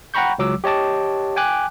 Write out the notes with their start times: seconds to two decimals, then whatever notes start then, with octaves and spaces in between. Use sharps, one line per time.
0.14 F#5 G5 A#5 B5 C#6 G6
0.39 C#2 F#3 D6 E6
0.64 G4 C#5 D#5 A5 D6
1.36 G5 G#5 D6 F#6